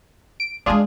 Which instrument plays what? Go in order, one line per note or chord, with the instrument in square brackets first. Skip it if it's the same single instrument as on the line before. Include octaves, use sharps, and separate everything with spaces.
[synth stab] D7
[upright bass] G3 G#3 [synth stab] D4 F4 G#4